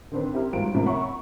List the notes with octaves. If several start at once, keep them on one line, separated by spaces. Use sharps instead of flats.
D3 D#3 C4 D4 B4
C4 E4 G4 A#4
G#1 G2 F#3 F4 C5 D7
C#2 A2 C3 F3 A#3
C#5 E5 F#5 A#5 B5 C#6
C#6